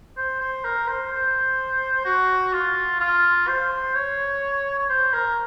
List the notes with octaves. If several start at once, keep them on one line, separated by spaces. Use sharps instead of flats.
C5
C5
A#4
C5
C5
F#4
F4
F4
C5
C#5
C#5
C5
A#4